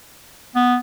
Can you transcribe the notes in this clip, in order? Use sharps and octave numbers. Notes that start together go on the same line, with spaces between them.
B3